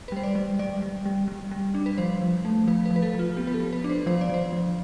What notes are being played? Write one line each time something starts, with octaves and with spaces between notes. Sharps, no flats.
B4
G3 C5
D5
G3
G3 D5
G3
G3
G3
G3
D4
B4
F3 C5
F3
A3
F3 B4
B4
F3
B4
A4
F3 F4
B3 G4
B4
A4
B3
B4
D4
C5
F3 C5
D5
F3 C5
F3